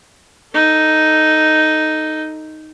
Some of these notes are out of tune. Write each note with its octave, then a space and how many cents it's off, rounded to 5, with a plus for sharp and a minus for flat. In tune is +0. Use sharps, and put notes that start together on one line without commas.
D#4 +0 A4 +0